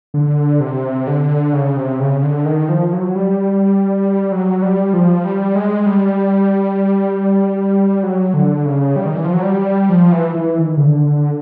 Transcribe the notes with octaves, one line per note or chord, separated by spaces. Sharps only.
D3
C3
D3
C#3
C3
C#3
D3
D#3
F3
F#3
G3
F#3
G3
F3
G3
G#3
G3
F#3
D3
C#3
G3
D#3
E3
F3
F#3
G3
F3
E3
E3
D#3
C#3
D3